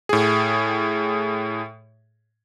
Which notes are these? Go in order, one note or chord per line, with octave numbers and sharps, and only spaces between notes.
A2 G#4